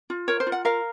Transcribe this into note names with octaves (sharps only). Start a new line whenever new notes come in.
F4
A#4 C#5
C5
F4
F#5
A#4 F5